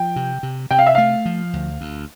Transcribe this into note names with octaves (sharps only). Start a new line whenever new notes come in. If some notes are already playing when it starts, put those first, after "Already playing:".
Already playing: F3 G5
C3
C3
C3 G5
F5
E5
A3 F5
F3
D2
D2